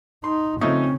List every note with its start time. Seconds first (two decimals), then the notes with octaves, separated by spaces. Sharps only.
0.24 D#4 C6
0.61 C#3 F3 A3 C4 C#4 D#4